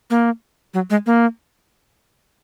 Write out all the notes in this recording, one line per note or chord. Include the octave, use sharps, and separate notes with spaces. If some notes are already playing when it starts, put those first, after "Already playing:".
A#3
F#3
G#3
A#3